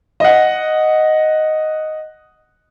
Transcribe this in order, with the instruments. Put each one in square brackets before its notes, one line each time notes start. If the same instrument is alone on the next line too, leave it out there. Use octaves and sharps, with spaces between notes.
[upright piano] D#5 F#5